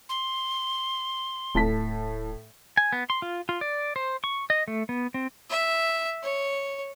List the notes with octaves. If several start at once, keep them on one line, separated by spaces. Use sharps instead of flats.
C6
D1 A2 A5 B6
G#5
B3
C6
F4
F4
D5
C5
C#6
D#5
A3
B3
C4
E5
C#5